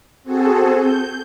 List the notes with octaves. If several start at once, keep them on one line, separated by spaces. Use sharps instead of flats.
C4 F#4 G#4 A4
G6